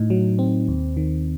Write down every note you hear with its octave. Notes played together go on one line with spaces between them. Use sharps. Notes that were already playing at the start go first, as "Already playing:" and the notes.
Already playing: A2 D#4
F#3
C4
D#2
D#3